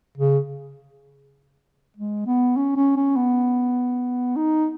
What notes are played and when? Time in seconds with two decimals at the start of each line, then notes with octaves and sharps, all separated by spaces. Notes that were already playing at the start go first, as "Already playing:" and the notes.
0.18 C#3
1.97 G#3
2.27 B3
2.57 C#4
2.77 C#4
2.97 C#4
3.16 B3
4.36 D#4